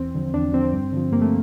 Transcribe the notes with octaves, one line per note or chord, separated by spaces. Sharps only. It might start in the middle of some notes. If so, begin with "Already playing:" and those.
Already playing: E2 C4
D3 F3
E2 D4
D3 F3 C4
G2
D3 F3
G2 A#3
A3